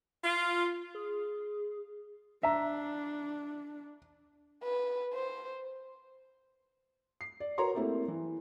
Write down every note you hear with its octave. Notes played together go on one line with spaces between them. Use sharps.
F4
G#4
D4 E5 A#5
B4
C5
C7
D5
F#4 A#4 B4 C#5 A#5 C6
A3 A#3 C4 E4 G4 A4
E3